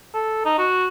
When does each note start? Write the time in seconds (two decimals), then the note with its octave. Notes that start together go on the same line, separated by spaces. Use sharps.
0.14 A4
0.45 D#4
0.58 F#4